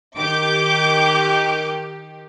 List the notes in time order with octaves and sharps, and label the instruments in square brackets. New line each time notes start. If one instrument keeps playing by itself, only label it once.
[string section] D#3 G4 [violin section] D6 G6